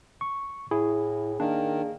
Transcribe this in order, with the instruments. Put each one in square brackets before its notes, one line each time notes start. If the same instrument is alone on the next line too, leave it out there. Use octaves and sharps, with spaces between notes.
[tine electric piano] C#6
[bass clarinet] A2 [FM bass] E4 [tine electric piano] G#4
[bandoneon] D#3 [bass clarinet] A#3 [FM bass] D4